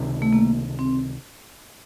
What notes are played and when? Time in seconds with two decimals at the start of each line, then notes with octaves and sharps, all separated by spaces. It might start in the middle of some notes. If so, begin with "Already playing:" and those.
Already playing: C#2 C3 D#3
0.22 A3
0.33 A#3
0.79 C4